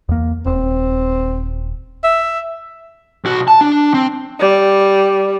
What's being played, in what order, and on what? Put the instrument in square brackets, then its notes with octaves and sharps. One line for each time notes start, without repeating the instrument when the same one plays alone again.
[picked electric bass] E2 A#3
[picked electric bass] D#1 [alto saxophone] C4
[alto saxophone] E5
[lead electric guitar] B1 F#4
A5
D4
C4
[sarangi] G3